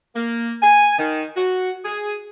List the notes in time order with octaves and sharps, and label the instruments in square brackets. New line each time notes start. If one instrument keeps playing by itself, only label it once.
[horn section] A#3
G#5
D#3
F#4
G#4